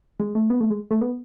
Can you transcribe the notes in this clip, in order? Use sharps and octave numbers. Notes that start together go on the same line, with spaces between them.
G#3
A3
B3
A3
G#3
A3
B3